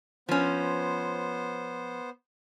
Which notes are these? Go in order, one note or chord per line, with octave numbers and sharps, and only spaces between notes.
F3 B3 C#4 C5